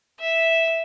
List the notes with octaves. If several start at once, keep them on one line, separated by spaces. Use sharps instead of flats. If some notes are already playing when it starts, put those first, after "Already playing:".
E5